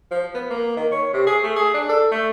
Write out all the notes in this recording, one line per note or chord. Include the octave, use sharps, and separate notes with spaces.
F3
B3
A#3
D#3
C#5
C3
G#4
A3
G#4
D4
A4
A3